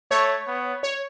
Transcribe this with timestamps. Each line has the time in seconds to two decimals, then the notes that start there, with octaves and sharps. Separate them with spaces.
0.11 A3 C#5
0.47 B3
0.83 C#5